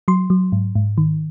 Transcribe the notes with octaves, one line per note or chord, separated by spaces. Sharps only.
F#3 C6
F#3
G#2
G#2
D#3